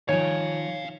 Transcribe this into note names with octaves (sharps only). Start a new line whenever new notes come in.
D#3 F3 C#5 F5 G#5